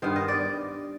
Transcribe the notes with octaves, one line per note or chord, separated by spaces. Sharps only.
G2 D#3 B3 C5
D#5
D5